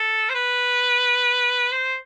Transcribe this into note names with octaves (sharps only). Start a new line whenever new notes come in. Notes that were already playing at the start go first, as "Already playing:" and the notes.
Already playing: A4
C5
B4
C5